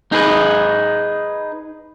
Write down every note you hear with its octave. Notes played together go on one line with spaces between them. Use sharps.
D#4 G#4 B4